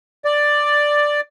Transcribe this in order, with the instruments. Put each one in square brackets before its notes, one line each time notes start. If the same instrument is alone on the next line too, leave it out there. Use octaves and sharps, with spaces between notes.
[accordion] D5